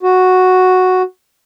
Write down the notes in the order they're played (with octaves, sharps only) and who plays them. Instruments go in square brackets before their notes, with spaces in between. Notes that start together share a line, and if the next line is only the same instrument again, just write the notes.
[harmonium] F#4